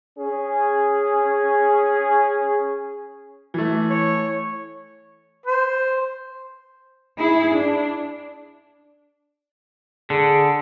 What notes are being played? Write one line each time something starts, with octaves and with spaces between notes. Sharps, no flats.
C#4 G#4
E3 A3
C#5
C5
E4 G#4
D4
D3 G#4